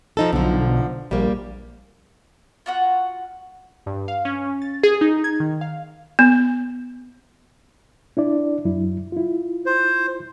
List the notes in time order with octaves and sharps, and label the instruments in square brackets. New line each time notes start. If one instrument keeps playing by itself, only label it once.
[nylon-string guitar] F3 D#4 A4
[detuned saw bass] B1 [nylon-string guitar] D3 F3
[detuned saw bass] A#1 [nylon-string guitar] G3 A#3
[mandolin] F4 F#4 F#5
[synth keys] G2
F5
C#4
A6
G#4
D#4
G#6
D#3
F5
[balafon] B3
[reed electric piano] D4 E4 D5
F#2 F#3 E4
E4 F4
[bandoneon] C5